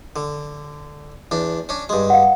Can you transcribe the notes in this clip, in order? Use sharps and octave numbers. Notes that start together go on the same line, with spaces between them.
D3
E2 D4
C#4 D4
G2 G#3
F5 F#5